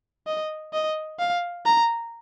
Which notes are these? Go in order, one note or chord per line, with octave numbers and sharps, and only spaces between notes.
D#5
D#5
F5
A#5